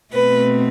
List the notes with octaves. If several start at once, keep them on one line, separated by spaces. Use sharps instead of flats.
B2 A3 C4 B4